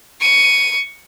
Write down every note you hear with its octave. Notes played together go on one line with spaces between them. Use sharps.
C#6 D#7